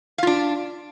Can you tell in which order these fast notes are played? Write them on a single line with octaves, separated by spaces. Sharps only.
F5 F4 D4